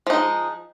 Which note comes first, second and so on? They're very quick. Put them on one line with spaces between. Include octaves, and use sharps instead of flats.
F3 D#4 G#3